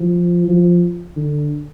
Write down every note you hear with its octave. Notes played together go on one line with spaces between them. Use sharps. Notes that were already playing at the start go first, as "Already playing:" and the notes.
Already playing: F3
F3
D3